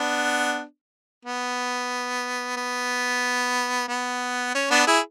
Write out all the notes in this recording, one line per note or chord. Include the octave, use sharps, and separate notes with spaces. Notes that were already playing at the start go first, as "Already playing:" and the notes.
Already playing: B3 D4
B3
B3
B3
C#4
B3 D4
E4 G#4